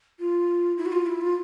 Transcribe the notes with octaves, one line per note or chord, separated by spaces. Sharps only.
F4
E4
F#4
F4
E4
F4